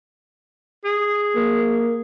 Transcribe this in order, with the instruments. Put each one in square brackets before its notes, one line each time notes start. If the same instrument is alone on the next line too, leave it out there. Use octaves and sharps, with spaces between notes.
[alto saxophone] G#4
[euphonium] A#3